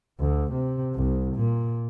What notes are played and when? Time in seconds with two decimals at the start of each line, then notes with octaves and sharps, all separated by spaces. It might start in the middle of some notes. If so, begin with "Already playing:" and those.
0.19 D2
0.53 C3
0.95 C2
1.36 A#2